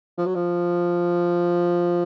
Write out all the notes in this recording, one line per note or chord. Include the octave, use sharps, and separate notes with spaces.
F3
F#3
F3